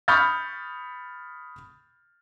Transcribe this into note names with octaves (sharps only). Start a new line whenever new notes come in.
B5 C#6 D#6 F6 G6 A6